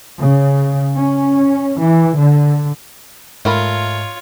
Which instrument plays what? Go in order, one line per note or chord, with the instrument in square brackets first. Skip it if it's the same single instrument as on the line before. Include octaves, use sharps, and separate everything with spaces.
[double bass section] C#3
C#4
E3
D3
[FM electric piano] G#2 [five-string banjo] A3 A#4 B5 [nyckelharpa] F4 C#5